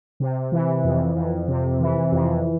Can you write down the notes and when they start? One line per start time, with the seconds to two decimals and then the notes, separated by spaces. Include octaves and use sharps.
0.20 C3
0.52 E3
0.84 F2
1.16 F2
1.48 C3
1.80 E3
2.12 F2